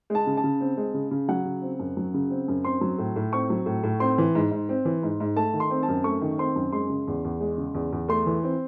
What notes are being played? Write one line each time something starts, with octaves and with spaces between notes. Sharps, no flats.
G#3 A5
C#3
A5
C#3
C4
G#3
C#3
C#3
F#3 F#5
C#3
C4
F#2
F#3
C#3
C4
F#2
C4 C6
F#3
A2
A2
C4 C#6
F#3
A2
A2
C4 C6
E3
G#2
G#2
C4
E3
G#2
G#2
A3 A5
D#3
C6
C4
A5
F#2
A3 C#6
D#3
C4 C6
F#2
G#3 C6
C#3
E2
E2
G#3
C#3
E2
E2
A3 C6
E3
C4